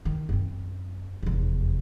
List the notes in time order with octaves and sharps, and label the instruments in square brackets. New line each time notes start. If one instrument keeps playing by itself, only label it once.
[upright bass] D#3
F#2 C4
F1 E2